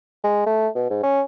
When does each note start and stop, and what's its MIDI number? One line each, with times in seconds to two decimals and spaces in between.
0.23 0.45 56
0.46 0.68 57
0.75 0.87 47
0.90 1.03 44
1.03 1.21 61